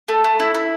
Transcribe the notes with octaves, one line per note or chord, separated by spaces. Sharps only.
A3
A3
E4
E4